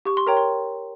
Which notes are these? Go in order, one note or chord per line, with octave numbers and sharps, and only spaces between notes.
G4 C#6
C6
A#4 C#5 G5 A#5
C6